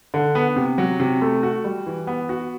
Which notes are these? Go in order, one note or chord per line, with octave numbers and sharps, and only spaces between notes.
D3
B3
C3
F#3
C3
A3
F#4
G3
E3
B3
F#4